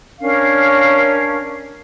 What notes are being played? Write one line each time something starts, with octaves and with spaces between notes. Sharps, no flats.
C#4 D4 A#4 F5